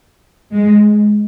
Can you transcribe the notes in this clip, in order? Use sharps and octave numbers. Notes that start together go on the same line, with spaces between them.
G#3